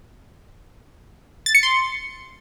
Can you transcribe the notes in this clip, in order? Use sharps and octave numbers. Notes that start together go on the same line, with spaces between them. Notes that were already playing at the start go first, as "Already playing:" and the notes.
A6
C#7
C6